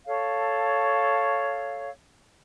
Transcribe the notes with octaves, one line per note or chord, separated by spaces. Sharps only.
A4 C#5 F5